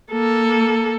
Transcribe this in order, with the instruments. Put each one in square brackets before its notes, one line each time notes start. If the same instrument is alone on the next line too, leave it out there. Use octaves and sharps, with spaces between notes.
[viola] A#3 A4